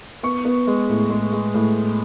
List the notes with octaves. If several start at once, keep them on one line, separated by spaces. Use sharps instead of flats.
B3 C#6
B3
G#3
A2
G#3
G#3
A2